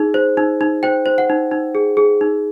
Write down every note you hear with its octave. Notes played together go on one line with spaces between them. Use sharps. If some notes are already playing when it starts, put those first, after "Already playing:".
Already playing: D#4 G#4
C5
D#4
D#4
C5 G5
C5
F#5
D#4
D#4
G#4
G#4
D#4